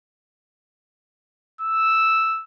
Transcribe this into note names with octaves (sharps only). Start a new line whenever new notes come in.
E6